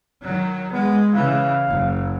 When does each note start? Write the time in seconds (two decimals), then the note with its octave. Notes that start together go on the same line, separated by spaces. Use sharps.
0.21 D#3 F#3
0.72 G#3 B3
1.14 C#3 E3 F5
1.67 F#1